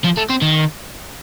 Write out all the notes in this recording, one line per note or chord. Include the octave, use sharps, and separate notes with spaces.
F3
A3
C4
D#3